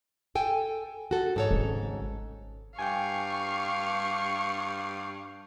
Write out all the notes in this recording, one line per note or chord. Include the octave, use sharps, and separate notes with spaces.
A4 G5 G#5
F#4 A4
G#2 A4 C#5
G#1 C#3
G2 F5 G5 G#5 C#6